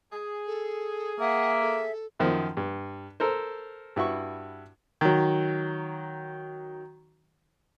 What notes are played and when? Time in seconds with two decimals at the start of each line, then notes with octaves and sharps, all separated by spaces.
0.12 G#4
0.47 A4
1.20 A#3 E5 F#5
1.61 A4
2.19 F#2 D#3 F3
2.57 G2
3.20 A4 A#4 C5
3.96 G2 E4 F#4 C#6
5.01 D#3 F#3